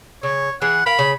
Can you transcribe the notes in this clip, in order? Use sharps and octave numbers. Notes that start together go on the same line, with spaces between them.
C#3 C#5
E3 G#4 F#5
A#4 F5 B5
C#3